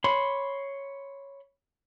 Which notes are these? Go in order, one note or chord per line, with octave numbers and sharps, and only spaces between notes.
C#5 B5 C6